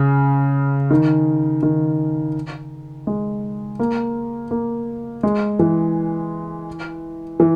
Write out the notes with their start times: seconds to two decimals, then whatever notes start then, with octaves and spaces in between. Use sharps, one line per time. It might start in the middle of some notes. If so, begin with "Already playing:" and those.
Already playing: C#3
0.91 D#3
1.63 D#3
3.07 G#3
3.80 A#3
4.51 A#3
5.23 G#3
5.59 E3
7.40 E3